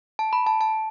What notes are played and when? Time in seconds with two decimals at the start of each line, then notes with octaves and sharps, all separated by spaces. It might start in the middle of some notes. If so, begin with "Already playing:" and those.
0.19 A5
0.33 B5
0.47 A5
0.61 A5